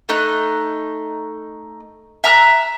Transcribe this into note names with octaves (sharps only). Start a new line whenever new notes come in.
A3 D#4 F#6
E5 A#5 F6 F#6